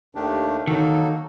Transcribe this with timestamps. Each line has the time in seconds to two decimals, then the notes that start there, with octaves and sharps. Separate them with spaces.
0.15 D#2 D#3 A3 D4 G4
0.67 D#3 F#3 A#3 D#4 F#4 A4